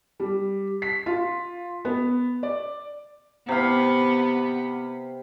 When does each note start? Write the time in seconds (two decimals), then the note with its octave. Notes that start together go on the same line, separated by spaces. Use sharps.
0.20 G3
0.82 B6
1.06 F4
1.85 B3
2.43 D5
3.49 C3 B3 F5